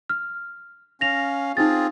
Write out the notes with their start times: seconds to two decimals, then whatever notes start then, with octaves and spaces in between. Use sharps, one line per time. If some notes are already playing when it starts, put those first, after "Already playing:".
0.10 F6
1.01 C#4 F5 A#6 F7
1.57 C4 D#4 F4 G#4 A6